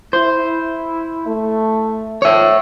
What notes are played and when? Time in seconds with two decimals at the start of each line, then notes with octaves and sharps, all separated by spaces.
0.13 E4 C5
1.27 A3
2.22 D#3 F3 C#5 E5